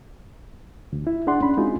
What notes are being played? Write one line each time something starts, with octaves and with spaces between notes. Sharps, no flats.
D2
E4
D4 G#4 D5 F#5 C6
C#4 B5
G#3 C4 D#4 F4 F#4 G#4